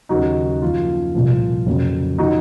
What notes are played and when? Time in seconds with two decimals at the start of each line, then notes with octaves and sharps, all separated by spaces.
0.09 D#2 C#3 F#3 D#4 F#4
0.62 F#2 F3 A#3 F4
1.15 C2 A#2 F3
1.66 F2 C#3 F#3 A#3
2.18 F3 A#3 D#4 F#4